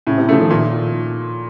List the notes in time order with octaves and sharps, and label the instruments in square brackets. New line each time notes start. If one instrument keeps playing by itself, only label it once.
[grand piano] A2 [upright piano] C#3
[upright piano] C3
[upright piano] C#3 [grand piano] F3 A3
[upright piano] D#3
[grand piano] A#2